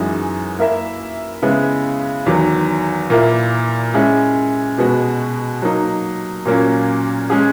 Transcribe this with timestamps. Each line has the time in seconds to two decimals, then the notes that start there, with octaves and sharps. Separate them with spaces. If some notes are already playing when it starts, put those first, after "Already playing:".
Already playing: F#2 E3 G#3 D#4 F#4
0.59 A#3 E4 A#4 E5
1.42 C#3 G#3 B3 E4
2.26 E2 D#3 F#3
3.10 A#2 A#3 E4
3.94 G#3 C#4 E4
4.78 B2 G#3 B3 F#4
5.62 F#3 A#3 D#4
6.46 A#2 F#3 A#3 C#4
7.30 G#3 C#4 G#4